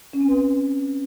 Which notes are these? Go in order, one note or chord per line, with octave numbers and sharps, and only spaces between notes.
C#4
C4
B4